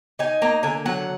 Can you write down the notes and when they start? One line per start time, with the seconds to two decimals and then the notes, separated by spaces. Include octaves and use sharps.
0.19 D#4 G#5
0.42 A#3 A#5
0.63 D3 G#5
0.86 F#3 F#5